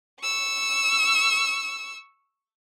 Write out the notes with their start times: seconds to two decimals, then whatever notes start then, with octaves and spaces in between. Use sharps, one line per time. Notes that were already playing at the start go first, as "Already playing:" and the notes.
0.22 C#6 E6